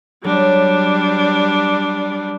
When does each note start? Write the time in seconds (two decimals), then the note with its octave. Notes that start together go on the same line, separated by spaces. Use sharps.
0.24 F#3 G3 D4